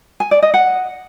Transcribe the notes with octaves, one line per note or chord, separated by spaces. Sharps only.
G#5
D5
D#5
F#5